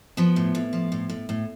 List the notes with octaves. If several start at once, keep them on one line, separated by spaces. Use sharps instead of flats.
F3 B3
A2
A2
F3
A2
A2
A2